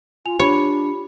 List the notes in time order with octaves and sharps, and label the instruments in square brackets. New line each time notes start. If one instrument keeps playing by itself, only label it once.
[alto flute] F4 [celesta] G#5 F7
[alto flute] D4 [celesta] F4 G4 B5 [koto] C#5